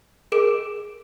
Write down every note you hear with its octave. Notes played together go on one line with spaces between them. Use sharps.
G#4 A#4 D6 D7 E7